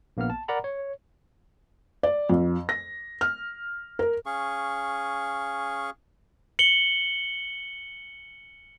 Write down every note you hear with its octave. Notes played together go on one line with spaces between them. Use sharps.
A#1 A#3 B3 F6
A5
A#4 D5 F#5 A#5 B5
C#5
D5
F2
A#6
F6
A#4
C#4 G#4 F5 C#6
C#7 F#7 G7